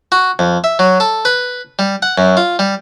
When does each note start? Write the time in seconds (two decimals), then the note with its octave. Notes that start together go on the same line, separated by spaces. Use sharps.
0.12 F#4
0.39 F2
0.64 E5
0.79 F#3
1.00 A4
1.25 B4
1.79 G3
2.02 F#5
2.18 F#2
2.37 F4
2.59 G3